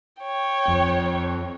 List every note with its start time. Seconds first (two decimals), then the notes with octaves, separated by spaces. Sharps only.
0.21 C#5 G5
0.68 F2